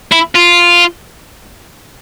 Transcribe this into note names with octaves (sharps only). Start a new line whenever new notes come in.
E4
F4